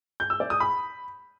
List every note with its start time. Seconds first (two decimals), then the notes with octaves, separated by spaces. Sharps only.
0.20 G6
0.30 E6
0.40 D5
0.50 D#6
0.60 B5